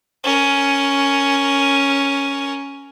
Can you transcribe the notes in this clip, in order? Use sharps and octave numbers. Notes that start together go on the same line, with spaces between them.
C#4 A#4